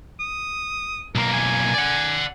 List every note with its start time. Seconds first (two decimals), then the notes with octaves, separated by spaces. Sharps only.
0.20 D#6
1.15 B1 A#3 A#4
1.33 G#5
1.74 D5 F#5